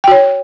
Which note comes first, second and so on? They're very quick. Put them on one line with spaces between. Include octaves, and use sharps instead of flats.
G5 F#4 C#5